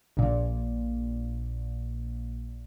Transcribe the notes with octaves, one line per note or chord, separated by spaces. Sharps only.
A#1 A#2